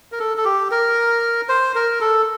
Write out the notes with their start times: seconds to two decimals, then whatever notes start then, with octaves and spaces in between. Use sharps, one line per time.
0.12 A#4
0.19 A4
0.38 A4
0.45 G4
0.71 A#4
1.49 C5
1.75 A#4
2.01 A4